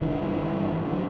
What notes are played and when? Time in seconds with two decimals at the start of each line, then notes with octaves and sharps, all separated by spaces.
0.01 G#1 D3 E3
0.18 G2 D3
0.35 G#1
0.52 G2 D3
0.69 A1
0.85 D3
0.92 F#3